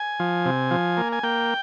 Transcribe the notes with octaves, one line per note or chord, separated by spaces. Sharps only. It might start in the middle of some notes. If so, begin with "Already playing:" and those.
Already playing: G#5
F3
C3
F3
A#3
G#5
A#3 G5